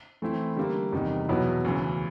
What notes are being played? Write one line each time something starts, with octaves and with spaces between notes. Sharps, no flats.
E3 A3 C4 E4
D3 G3 A#3
E2 C3 D#3 G3
E2 B2 F#3 B3 E4
D2 C#3 E3